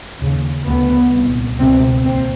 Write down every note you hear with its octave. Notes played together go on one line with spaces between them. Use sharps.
D#2 C#3
D2 C#3 B3
C2 A#2
C#2 B2 C4
D#2 C4